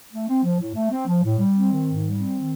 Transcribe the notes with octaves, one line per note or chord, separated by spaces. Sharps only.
A3
C4
F3
A2
A3
C4
F3
A2
G3
C4
D#3
G#2
G3
C4
D#3